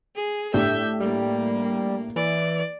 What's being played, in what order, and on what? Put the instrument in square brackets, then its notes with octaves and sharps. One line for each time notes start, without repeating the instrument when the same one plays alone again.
[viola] G#4
[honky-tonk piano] A2 D4 G4 [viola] E5 [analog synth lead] G6
[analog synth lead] G3 [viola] A#3
[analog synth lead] E3 [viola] D5